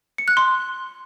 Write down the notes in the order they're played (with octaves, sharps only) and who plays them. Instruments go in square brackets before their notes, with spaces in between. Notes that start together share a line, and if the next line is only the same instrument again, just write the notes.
[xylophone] C#7
F#6
C6